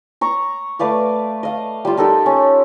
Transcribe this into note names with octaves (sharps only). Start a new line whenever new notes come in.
A#5 C#6
A3 B4 D5 F5
D#5 F5
G3 F4
D#4 G4 A4 A#4
C#4